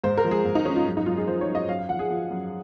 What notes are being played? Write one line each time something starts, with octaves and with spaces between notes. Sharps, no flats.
G#2 C5
A#4
F3
G#4
G#2
D#4
F3 C#4
F4
F#2
D#4
F#2 F4
G#4
F3 C5
C#5
F#2
D#5
F#2 F5
F5
F3 F#5
G#4
F3
F#2